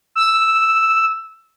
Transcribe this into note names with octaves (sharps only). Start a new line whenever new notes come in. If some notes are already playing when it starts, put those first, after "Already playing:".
E6